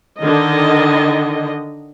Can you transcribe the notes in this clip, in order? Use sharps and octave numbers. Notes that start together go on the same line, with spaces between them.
D3 D#3 D#5